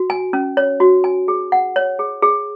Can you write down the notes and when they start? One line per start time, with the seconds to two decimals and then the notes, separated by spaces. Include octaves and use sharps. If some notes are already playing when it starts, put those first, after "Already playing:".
Already playing: F#4
0.10 G#5
0.33 C#4
0.57 C#5
0.80 F#4
1.04 G#5
1.28 G#4
1.52 F#5
1.76 C#5
1.99 G#4
2.23 G#4